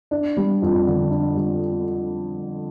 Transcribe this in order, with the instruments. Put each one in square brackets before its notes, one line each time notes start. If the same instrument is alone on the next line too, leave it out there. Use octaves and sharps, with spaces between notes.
[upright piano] D4
G3
F2
D3
D4
G3